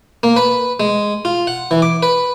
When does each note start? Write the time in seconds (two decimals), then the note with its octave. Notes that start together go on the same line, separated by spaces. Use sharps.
0.23 A#3
0.36 B4
0.80 G#3
1.25 F4
1.47 F#5
1.71 E3
1.82 D6
2.03 B4